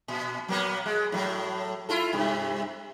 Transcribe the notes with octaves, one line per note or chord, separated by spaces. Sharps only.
A#2
F#3 A#3 B3
G#3
A2 F#3
E4 F4 A4
G2 C3